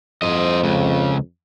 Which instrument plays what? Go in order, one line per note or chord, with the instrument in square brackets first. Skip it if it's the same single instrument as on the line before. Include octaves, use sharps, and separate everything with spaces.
[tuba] F2 [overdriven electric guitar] C5 D#5
[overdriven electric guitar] C#2 C#3